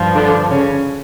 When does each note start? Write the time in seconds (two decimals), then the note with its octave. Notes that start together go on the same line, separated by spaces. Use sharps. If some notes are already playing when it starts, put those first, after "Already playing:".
Already playing: G2 F3
0.15 D3 D4
0.50 C#3 C#4